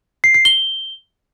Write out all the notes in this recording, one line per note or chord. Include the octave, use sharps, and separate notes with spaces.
C7
C7
G7